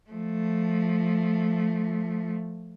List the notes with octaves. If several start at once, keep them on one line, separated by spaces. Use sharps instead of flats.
F3 A3